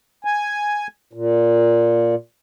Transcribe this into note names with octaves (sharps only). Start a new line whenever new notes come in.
G#5
A#2